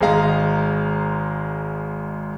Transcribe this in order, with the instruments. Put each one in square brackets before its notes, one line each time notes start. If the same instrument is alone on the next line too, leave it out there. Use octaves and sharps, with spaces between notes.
[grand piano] G#1 G#2 G#3 F5 A#5